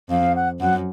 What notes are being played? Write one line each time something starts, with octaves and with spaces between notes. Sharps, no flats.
F2 F5
F#5
F#2 F#5